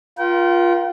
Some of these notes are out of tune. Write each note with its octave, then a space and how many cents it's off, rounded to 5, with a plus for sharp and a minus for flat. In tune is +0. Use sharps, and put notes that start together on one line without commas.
F4 +0 A#4 +40 G5 -40